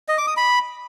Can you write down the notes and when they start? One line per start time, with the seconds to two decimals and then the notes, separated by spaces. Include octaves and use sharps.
0.08 D#5
0.18 D6
0.27 D#6
0.37 B5